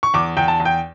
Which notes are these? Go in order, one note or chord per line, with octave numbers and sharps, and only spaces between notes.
C#6
E2 D6
E2 G5
A5
E2
G5